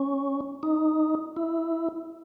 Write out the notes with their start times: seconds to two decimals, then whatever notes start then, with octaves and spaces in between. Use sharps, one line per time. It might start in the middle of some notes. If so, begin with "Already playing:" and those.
Already playing: C#4
0.63 D#4
1.36 E4